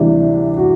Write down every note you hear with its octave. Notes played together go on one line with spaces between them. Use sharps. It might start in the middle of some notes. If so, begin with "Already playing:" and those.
Already playing: D2 C3 E3 G3 D4
F#4